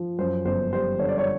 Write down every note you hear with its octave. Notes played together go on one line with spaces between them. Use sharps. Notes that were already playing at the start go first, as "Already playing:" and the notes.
Already playing: F3
F#2 C5
G1 C5
G3 C5
D3 C#5
D5
C#5